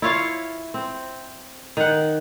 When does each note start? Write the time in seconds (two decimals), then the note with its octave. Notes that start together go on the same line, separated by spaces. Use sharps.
0.02 E4 F4 C#5 F5
0.74 C4
1.77 D#3 F#5